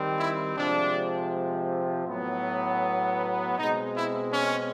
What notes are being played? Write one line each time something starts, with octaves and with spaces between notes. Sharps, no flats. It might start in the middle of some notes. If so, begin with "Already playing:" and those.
Already playing: D#3 G3 C4
E4
C3 F3 G#3 D4
A2 F#3 B3
B2 G#3 C4 D#4
E4
C#4